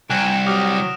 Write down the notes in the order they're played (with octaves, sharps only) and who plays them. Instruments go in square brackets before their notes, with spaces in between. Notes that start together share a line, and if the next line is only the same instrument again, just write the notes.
[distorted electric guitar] C2 [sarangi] G5 [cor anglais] G#5 [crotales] F#6 D7 E7
[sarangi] F#3 [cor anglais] G4 [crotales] D#6 F6 A#6